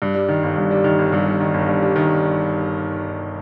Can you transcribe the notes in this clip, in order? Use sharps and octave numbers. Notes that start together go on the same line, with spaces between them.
G2
G3
D#3
G1
G2
G3
D#3
G1
G2
G3
D#3
G1
G2
G3
D#3